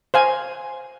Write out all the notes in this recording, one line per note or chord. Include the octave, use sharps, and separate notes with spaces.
C5 F5 G#5